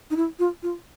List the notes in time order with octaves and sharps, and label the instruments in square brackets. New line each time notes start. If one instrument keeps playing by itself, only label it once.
[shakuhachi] D#4
E4
F4
F4